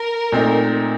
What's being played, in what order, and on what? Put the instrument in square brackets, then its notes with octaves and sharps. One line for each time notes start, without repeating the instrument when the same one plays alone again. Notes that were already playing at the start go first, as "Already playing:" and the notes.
Already playing: [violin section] A#4
[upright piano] A#2 A3 C4 D#4